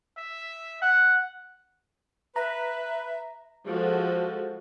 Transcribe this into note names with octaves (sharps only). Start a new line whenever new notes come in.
E5
F#5
B4 E5 A#5
F3 G#3 F#4 A4